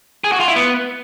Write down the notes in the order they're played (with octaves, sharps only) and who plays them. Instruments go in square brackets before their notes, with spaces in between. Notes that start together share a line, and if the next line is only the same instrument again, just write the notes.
[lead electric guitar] G#4
F#4
F4
E4
B3